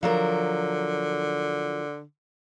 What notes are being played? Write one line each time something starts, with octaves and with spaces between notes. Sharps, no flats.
D3 F3 F#3 A#4